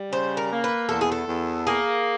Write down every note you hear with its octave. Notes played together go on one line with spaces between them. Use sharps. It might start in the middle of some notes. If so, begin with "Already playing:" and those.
Already playing: G3
C#3 C5
A#4
A#3
B4
E2 A4
G#4
A4
E2
A#3 G#4